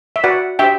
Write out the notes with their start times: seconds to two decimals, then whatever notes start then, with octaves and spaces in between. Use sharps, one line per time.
0.16 E5
0.24 F#4 B4 D5 F#5
0.59 D4 G4 C5 E5 G5